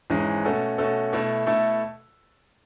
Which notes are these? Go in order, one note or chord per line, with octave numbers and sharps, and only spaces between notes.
G#1 G#2 E3 G#3 C#4
B2 A3 C#4 F#4 A4
B2 A3 C#4 F#4 A4
B2 A3 E4 A4
B2 A3 E4 A4